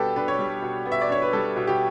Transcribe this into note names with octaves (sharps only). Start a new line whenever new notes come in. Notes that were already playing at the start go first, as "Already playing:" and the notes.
Already playing: B2 G3 B3 D4 G4 A4 B4
D4 B4
C#5
G3
B2
B3
E5
D5
D4 C#5
B4
G3 A4
B2
G4